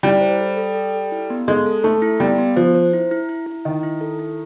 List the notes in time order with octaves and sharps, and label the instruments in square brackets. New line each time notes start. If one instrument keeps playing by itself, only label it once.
[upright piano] G3 [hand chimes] E4
[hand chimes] C5
A4
A4
A4
A4
E4
B3
[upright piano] G#3 [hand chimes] A4
[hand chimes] A4
[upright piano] A3 [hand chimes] A4
[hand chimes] E4
[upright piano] G3 [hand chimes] B3
[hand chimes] B3
[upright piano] F3 [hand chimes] C5
[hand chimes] C5
E4
E4
E4
E4
[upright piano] D#3 [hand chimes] D#5
[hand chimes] E4
A4
E4